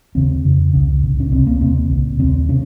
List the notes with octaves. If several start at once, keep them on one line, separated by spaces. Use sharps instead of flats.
D#2 C#3 C4
F2 C#3
C#2 C#3
C2 A#2
C#4
C#2 C3 C4
A#3
D#2 C#3 C4
C2 A#2
D#2 C#3 C4
C3 C#4